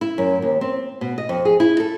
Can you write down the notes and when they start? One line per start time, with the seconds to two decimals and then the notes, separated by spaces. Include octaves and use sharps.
0.01 E4
0.18 F#2
0.42 D#2
0.61 C4
1.01 B2
1.18 D#5
1.29 F2
1.45 G#4
1.60 E4
1.80 A4